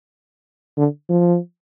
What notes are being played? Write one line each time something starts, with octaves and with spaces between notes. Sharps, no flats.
D3
F3